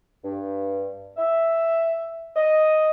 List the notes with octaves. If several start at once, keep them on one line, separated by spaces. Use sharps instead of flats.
G2
E5
D#5